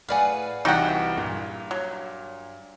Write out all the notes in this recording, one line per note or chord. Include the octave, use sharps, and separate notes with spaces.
A2 G#4 B4 D5 F5 F#5
C2 E3 D#4 F#4 F#5 G5
G2 A#2
F#3